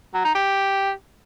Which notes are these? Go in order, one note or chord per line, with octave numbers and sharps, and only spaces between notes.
F#3
D#4
G4